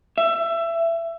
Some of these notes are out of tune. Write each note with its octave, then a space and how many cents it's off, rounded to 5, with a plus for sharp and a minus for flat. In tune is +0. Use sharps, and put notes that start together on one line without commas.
E5 +20